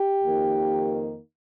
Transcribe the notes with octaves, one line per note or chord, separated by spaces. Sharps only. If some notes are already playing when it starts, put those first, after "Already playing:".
Already playing: G4
F2 D#3 A#3 D#4